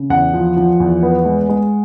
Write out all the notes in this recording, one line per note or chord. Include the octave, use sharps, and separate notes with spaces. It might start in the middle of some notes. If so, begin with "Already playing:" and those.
Already playing: C#3
E2 F#5
F3
F3
E2
B3
G#3
G#3